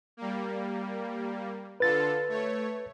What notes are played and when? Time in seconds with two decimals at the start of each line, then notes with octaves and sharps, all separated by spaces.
0.17 G3 A#3
1.80 D3 F4 A4 B4 A6
2.28 A3 C#5